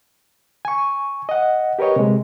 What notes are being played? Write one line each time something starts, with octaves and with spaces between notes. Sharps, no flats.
G#5 C#6
D#5 F#5
G4 A#4 B4 C#5 D#5
C3 G#3